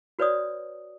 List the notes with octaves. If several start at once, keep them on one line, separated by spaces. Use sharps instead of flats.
F#4 B4 C#5 D5 D#6